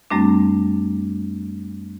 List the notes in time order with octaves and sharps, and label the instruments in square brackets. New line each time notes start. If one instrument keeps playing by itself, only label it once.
[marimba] F#2 G3 A3 C4 D4